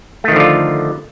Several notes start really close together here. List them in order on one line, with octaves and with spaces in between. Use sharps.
A3 D#3 F3 D3 F4